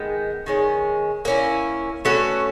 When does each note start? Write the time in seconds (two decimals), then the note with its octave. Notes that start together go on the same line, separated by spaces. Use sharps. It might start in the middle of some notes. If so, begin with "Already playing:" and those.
Already playing: D#3 G#3 B3
0.46 D#3 G#3 C#4
1.25 A#3 C#4 E4
2.05 A3 C#4 F#4 B4